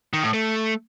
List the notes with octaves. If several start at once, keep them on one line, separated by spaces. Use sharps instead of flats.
D#3
A2
A3